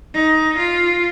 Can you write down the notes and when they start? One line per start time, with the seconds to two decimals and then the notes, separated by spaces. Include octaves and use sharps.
0.14 D#4
0.58 F4